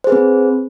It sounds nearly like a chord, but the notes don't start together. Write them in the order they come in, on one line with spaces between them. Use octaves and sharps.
C5 G#4 B4 C4